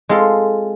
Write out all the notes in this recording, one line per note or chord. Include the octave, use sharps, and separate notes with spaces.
G#3 C4 F4 A4